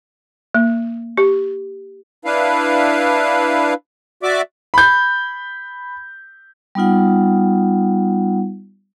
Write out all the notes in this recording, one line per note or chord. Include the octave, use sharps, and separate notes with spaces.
A#3
G4
D4 E4 B4 F5
F#4 D5 E5 D6
B5 G6
G3 B3 D#4 F4 F#5